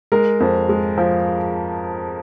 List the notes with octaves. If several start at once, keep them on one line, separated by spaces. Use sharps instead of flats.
G#3 A#4
F2
G#3
F3